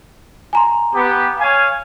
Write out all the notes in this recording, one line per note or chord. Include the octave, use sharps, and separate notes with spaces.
G#5 A#5 C6
B3 G4
C#5 F5 G#5